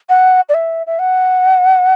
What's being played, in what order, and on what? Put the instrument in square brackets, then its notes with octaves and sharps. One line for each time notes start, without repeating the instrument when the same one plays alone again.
[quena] F#5
D5
E5
E5
F#5